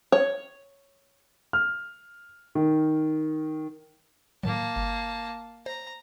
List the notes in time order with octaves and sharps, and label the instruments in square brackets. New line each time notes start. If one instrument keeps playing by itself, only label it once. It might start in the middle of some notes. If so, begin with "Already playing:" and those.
[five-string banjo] C#5
[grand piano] F6
D#3
[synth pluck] A2 D#3 F#3 [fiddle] A#3 A5
[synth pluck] G1
[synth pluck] C5 [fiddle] A#5